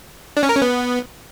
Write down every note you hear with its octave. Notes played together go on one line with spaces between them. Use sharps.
D4
C#4
A#4
C#4
B3